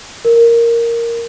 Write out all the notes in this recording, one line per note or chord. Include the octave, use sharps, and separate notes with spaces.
A#4